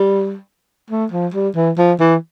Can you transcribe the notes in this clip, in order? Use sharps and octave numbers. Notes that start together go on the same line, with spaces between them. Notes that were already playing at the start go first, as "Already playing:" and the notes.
Already playing: G3
A3
F3
G3
E3
F3
E3